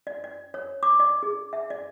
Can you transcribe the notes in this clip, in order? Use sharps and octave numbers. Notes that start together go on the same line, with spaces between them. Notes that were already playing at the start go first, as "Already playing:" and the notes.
D5
D5
C#5
D6
D5
G#4
E5
D5